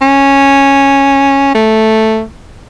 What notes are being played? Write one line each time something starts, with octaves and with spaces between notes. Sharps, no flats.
C#4
A3